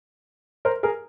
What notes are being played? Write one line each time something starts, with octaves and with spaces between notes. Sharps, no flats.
A#4 C5
G#4 A#4